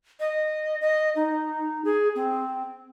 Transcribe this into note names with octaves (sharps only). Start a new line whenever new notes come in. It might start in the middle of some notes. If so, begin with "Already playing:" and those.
D#5
D#5
D#4
G#4
C4